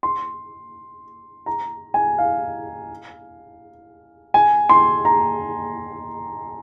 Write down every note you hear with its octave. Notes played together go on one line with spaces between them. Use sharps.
C6
A#5
G#5
F5
G#5
C6
A#5